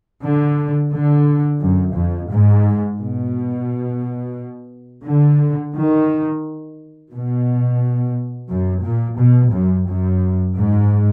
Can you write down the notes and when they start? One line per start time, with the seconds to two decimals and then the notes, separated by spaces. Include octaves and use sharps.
0.23 D3
0.92 D3
1.61 F#2
1.95 F2
2.30 G#2
2.99 B2
5.06 D3
5.75 D#3
7.12 B2
8.50 F#2
8.84 A#2
9.18 B2
9.53 F#2
9.87 F#2
10.57 G#2